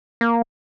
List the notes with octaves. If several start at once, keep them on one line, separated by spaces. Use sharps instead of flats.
A#3